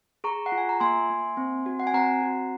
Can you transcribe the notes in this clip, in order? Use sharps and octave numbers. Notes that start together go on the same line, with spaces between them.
G#4 A#5 C#6
F#5
F4
G#5
A#5
A#3 G#5 C6
A#3
C4
F#4
F#5
G#5
C4 F#5 A#5
F#4